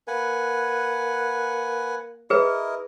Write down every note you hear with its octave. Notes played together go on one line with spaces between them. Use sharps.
A#3 B4 F#5 G#5
E4 G#4 A#4 B4 D#5